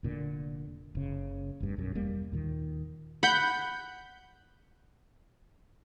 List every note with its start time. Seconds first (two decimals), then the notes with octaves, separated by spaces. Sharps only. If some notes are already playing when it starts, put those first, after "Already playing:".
0.03 F1 A#2 D3
0.95 F#1 C#3
1.60 F1 G2
1.77 B1 F#2
1.95 E1 G3 A#3
2.32 D#2 A#2 D#3
3.23 F#5 B5 G6